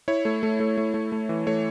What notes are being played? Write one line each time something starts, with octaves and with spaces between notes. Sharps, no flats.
E4 C#5
A3
A3
A3
A3
A3
A3
E3
A3 C#5